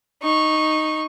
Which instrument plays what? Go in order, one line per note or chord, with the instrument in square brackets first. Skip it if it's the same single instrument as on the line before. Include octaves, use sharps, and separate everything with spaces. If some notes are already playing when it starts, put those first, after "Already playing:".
[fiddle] D#4 C#6